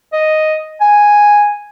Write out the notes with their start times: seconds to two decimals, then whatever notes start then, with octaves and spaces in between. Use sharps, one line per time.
0.13 D#5
0.81 G#5